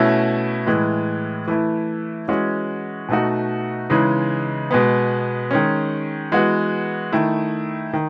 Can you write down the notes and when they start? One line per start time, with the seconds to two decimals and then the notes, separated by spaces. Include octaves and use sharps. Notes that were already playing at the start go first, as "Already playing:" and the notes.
Already playing: B2 A3 C#4 E4
0.66 A2 E3 G#3
1.47 E3 A3 E4
2.28 E3 G#3 C#4 F#4
3.09 B2 A3 D#4 F#4
3.90 C#3 E3 G#3 D#4
4.71 B2 G#3 B3
5.51 D#3 G#3 C#4
6.32 E3 G#3 B3 F#4
7.13 D#3 A3 E4
7.93 D#3